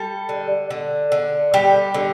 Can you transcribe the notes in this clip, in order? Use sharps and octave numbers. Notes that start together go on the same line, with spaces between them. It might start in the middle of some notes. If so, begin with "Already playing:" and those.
Already playing: G3 A4
D3
D3
D3
G3 G4
D3